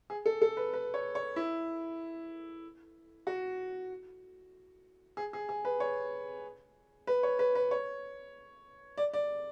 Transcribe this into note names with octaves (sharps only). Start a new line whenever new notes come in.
G#4
A4
A4
B4
B4
C#5
C#5
E4
F#4
G#4
G#4
G#4
B4
C#5
B4
C#5
B4
B4
C#5
D5
D5